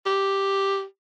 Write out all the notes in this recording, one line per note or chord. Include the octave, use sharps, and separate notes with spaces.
G4